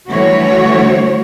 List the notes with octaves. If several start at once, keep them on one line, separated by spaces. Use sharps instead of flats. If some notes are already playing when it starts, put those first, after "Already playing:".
D3 E3 G3 A3 F#4 C#5